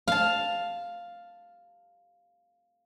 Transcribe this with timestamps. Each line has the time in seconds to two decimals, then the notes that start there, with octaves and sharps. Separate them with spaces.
0.08 F5 A5